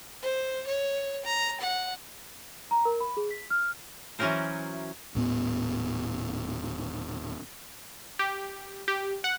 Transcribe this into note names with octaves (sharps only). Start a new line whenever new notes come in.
C5
C#5
A#5
F#5
A#5
A#4
B5
G#4
B6
F6
E3 F#3 C#4 F#4 A#4 C5
D#1 A2 B3
G4
G4
F#5